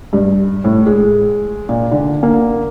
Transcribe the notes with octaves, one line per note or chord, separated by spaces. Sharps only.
G2
A2
G#3
A#2
D3
A#3